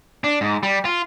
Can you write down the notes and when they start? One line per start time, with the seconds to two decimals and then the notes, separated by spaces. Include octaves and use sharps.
0.24 D4
0.41 G#2
0.63 G3
0.85 F4